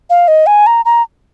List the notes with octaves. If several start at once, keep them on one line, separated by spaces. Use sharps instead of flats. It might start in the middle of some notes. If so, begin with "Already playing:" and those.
F5
D#5
G#5
A#5
A#5